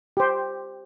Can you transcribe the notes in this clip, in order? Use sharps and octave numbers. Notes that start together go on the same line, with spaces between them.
G4 C5